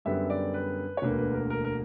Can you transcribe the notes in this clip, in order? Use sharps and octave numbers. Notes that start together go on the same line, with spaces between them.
F#2 D3 G3 B3 E5
D5
B4
C#5
E1 D2 D3 A#3 B4
B4
A#4
A#4
A#4